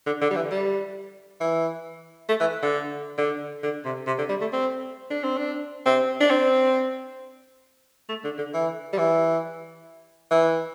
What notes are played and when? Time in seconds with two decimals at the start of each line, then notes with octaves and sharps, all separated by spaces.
0.06 D3
0.22 D3
0.31 G3
0.36 E3
0.51 G3
1.41 E3
2.29 A3
2.40 E3
2.63 D3
3.18 D3
3.63 D3
3.85 C3
4.07 C3
4.19 D3
4.29 G3
4.41 A3
4.53 C4
5.11 D4
5.24 C4
5.38 D4
5.86 C4
6.21 D4
6.31 C4
8.09 A3
8.24 D3
8.38 D3
8.54 E3
8.93 G3
8.98 E3
10.31 E3